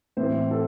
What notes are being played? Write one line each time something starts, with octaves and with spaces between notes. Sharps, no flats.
A2 E3 C4 C5
A4